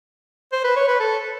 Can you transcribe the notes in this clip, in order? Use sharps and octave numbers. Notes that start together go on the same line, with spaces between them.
C5
B4
C#5
B4
A4